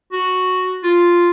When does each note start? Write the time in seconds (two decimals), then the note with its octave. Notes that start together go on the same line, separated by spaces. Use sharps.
0.13 F#4
0.83 F4